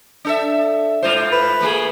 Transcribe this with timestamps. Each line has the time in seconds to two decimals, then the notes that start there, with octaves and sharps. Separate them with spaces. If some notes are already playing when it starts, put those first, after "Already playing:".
0.25 D4 A4 E5
1.03 G#2 F4 C5
1.32 B4
1.61 A3 A#3 G#4